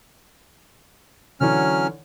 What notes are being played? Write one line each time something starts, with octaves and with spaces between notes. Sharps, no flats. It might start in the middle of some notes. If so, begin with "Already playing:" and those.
D3 E3 F#3 C#4 C#5 F6